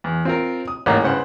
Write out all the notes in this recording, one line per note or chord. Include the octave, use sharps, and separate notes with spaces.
E2
C4 F4 A#4
D#6
A1 G#2 A#3 C#5 A#5
G2 C#3 B4 C5 F#5